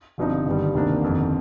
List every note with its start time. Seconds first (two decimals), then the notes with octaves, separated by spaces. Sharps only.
0.18 G1 G2 F3 C4 D#4
0.46 G1 G2 D#3 G3
0.74 D2 C3 D#3 A#3 D4
1.02 G1 F2 D#3